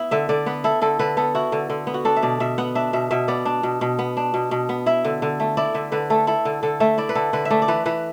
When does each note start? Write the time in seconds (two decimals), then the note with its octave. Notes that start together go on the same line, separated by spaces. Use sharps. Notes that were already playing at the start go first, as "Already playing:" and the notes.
Already playing: B3 E4
0.11 D3 E5
0.29 D3 D5
0.46 B3 B4
0.64 E4 A4
0.82 D3 A4
0.99 D3 B4
1.17 B3 A4
1.35 E4 F#4
1.52 D3
1.70 D3
1.87 B3
1.94 F#4
2.05 D4 A4
2.16 E5
2.22 B2 D5
2.40 B2 E5
2.58 B3 F#5
2.75 D4 E5
2.93 B2 E5
3.11 B2 E5
3.28 B3 D5
3.45 D4
3.63 B2
3.81 B2
3.99 B3
4.17 D4
4.34 B2
4.51 B2
4.69 B3
4.86 E4 E5
5.05 D3
5.22 D3
5.40 A3
5.57 E4 D5
5.74 D3 E5
5.92 D3 B4
6.10 A3 A4
6.27 E4 A4
6.45 D3
6.63 D3 A4
6.80 A3 E5
6.98 E4 D5
7.09 B4
7.15 D3 A4
7.33 D3 B4
7.45 E5
7.50 A3 D5
7.62 D5
7.68 E3 B4
7.86 E3 B4